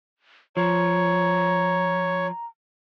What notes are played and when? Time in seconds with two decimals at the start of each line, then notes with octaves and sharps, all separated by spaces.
0.57 F3 C#5 A#5